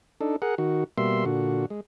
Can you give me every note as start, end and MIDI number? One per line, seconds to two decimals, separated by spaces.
0.21 0.36 62
0.21 0.36 63
0.21 0.36 69
0.42 0.55 68
0.42 0.55 70
0.42 0.55 78
0.58 0.84 51
0.58 0.84 66
0.98 1.24 47
0.98 1.24 55
0.98 1.24 58
0.98 1.24 76
0.98 1.24 84
1.25 1.66 46
1.25 1.66 50
1.25 1.66 66
1.70 1.81 56